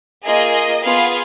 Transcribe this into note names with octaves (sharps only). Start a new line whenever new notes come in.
A#3 F4 G#4 D#5
B3 F4 G#4 F5